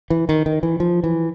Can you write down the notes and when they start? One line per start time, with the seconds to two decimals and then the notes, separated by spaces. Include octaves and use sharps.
0.10 E3
0.29 D#3
0.46 D#3
0.63 E3
0.80 F3
1.04 E3